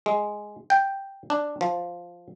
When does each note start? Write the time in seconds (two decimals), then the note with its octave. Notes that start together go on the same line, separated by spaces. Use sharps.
0.06 G#3
0.70 G5
1.30 D4
1.61 F3